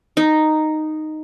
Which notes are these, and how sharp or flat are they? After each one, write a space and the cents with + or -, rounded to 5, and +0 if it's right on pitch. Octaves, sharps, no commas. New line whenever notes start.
D#4 -5